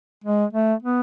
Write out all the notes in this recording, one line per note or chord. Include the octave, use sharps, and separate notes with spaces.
G#3
A3
B3